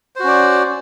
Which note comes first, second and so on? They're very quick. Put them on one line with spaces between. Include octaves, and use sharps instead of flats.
C5 F#4 C#4 D5